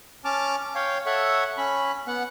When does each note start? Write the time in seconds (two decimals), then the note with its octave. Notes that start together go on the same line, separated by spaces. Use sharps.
0.25 C#4 A5 D6 F6
0.75 C#5 F5 G5
1.06 A4 C#5 E5 F#5
1.58 C#4 B5
2.07 B3 F#5